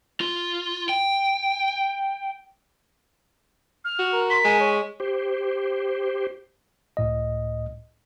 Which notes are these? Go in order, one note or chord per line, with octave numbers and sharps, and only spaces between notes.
F4
G5
F6
F#4
A#4
C6 B6
G#3 G#5
C#5
G4 C5
C#2 A2 D#5